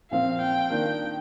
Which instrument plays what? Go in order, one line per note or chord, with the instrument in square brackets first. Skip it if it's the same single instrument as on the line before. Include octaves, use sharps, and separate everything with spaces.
[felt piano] A#2 F3 C4 [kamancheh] F5
[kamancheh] G5
[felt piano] D#3 A#3 D4 F4